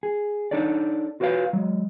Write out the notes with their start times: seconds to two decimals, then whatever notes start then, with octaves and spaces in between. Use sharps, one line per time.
0.03 G#4
0.51 D4 D#4 A4 C#5 D5
1.20 F4 F#4 B4 C#5 F5
1.53 F#3 G#3